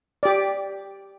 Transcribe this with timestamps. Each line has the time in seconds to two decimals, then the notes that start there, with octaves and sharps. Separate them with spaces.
0.23 G4 D5